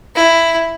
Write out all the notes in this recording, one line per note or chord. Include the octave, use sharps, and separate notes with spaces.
E4